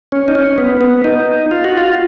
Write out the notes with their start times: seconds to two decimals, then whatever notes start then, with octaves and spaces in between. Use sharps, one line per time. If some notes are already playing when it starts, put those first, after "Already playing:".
0.12 C#4
0.28 D#4
0.35 C#4
0.58 B3
0.81 B3
1.04 D#4
1.51 F4
1.64 F#4
1.77 F4